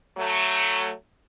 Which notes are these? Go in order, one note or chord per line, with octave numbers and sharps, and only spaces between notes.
F#3 A3